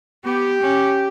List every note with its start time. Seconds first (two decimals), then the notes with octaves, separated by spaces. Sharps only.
0.24 B3 G4
0.61 C#4